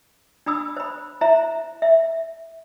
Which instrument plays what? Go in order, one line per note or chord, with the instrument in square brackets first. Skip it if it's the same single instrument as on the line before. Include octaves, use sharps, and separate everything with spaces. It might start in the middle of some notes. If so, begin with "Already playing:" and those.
[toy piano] D4 B5 D#6 E6
C5 B5
E4 C5 E5 A#5
E5